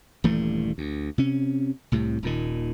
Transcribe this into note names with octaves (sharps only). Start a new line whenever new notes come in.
D#1 G2 E3 A3
D2
C3 C#4
C2 A2 C3
D#1 A#2 D#3